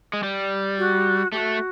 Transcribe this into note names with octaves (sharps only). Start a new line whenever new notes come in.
G#3
G3
F#4
A3 F#4 G4